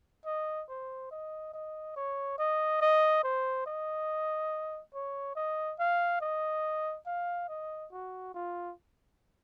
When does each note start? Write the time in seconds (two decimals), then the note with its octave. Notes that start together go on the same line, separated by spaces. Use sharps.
0.26 D#5
0.69 C5
1.11 D#5
1.54 D#5
1.96 C#5
2.39 D#5
2.81 D#5
3.24 C5
3.66 D#5
4.94 C#5
5.36 D#5
5.79 F5
6.21 D#5
7.06 F5
7.49 D#5
7.92 F#4
8.34 F4